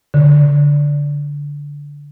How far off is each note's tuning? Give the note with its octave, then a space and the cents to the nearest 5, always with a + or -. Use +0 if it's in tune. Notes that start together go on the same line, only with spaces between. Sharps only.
D3 -15